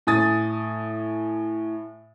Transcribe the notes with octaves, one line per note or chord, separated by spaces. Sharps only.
A2 G#5 D#6 A6